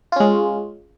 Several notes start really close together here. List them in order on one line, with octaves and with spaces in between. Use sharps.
F4 C#4 G#3